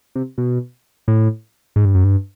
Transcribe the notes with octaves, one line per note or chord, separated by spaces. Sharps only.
C3
B2
A2
G#2
G2
F#2
G2